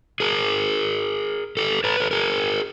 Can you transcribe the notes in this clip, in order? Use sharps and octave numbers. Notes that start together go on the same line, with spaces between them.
G#4 A#4
G4 A4
A4 B4
A4
G#4 A#4